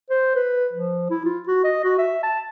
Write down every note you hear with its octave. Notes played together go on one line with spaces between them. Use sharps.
C5
B4
F3
E4
F4
F#4
D#5
F#4
E5
A5